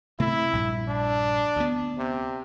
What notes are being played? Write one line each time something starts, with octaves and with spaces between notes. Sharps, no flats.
C3 A3 C4 E4
A#1 G2 A#2
D4
D2 B3
C3